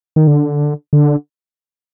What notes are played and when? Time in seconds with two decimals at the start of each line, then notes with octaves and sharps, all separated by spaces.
0.16 D#3
0.27 D3
0.93 D3